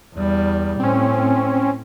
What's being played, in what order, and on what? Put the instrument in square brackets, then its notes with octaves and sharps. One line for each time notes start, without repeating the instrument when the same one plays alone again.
[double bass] E2 G3
[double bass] A2 [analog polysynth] C4 C#4